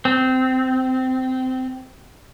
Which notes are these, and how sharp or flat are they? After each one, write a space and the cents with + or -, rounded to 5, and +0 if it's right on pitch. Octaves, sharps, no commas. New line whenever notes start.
C4 -15